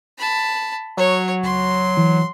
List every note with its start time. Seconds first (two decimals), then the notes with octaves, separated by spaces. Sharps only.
0.18 A5 B5
0.97 F#3 C#5
1.43 C#2 C6
1.97 E3